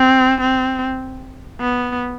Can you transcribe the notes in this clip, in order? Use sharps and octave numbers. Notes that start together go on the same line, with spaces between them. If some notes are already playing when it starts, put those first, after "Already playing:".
Already playing: C4
C4
B3